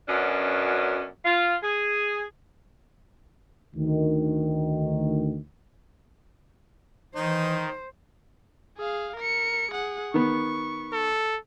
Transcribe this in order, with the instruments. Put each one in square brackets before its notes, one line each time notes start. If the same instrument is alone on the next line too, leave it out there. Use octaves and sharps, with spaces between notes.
[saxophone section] F#2 B2 C#4 D4
F4
G#4
[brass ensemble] D2 D#3
[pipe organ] D#3 [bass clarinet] E3 [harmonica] D#4 [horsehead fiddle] C5
[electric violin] G#4 F5
A#4 C#7
G#4 F#5
[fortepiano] D#3 B3 [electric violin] C#6
[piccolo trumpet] A4